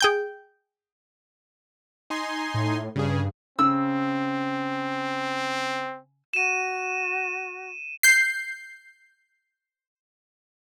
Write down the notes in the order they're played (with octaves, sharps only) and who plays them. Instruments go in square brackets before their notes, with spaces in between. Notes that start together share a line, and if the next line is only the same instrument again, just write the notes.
[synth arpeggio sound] G#4 G5 G6
[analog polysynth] D#4 G#5 C6
[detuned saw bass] A2
[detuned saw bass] G2 [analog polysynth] C#3 G#4
[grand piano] C#3 [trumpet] C4 [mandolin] E6
[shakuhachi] F#4 [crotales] D#7 E7
[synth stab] G6 C7